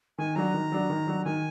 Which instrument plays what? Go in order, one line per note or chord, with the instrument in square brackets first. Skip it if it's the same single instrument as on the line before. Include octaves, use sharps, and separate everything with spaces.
[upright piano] D#3 [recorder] G#5
[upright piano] F#3 D4 F#4 [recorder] A#5
[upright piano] D#3
F#3 D4 F#4
D#3
F#3 D4 F#4
[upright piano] D#3 [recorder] G#5